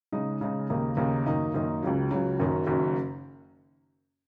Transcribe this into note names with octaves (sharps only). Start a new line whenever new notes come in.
C#3 G#3 D#4
C#3 G#3 D#4
D#2 C#3 A#3 D#4
D#2 C#3 A#3 D#4
F#2 D#3 A#3 D#4
F#2 D#3 A#3 D#4
C#2 C#3 F#3
C#2 C#3 F#3
F#1 F#2 D#3 F#3
F#1 F#2 D#3 F#3